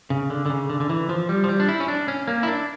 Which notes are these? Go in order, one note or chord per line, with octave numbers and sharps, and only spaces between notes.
C#3
D3
D3
C#3
D3
D3
E3
F3
G3
F3
G3
D4
E4
C#4
D4
C#4
A#3
E4
D4